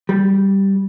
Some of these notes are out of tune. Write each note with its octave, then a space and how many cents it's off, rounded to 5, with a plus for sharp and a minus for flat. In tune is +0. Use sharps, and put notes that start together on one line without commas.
G3 -5